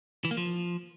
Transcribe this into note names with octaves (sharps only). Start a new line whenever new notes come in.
E3
A#3
F3